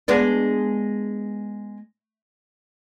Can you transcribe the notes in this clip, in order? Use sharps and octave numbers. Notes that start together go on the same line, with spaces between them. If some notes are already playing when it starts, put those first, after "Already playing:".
G#3 B3 D4